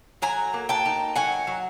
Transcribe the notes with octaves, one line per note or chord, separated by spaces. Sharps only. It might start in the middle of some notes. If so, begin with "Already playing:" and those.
F#3 G#5 A#5
A#3
G5 A5
D#4
F#3 F#5 G#5
F#3